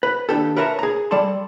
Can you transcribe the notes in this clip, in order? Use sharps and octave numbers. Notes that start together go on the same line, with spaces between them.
B4
D#2 D4 G4 A4
A#4 B4 C#5 E5 A5 A#5
G#4 A#5
G3 A4 D5 A5 C6